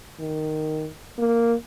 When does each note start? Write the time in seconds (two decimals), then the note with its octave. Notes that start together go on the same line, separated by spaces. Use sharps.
0.20 D#3
1.19 A#3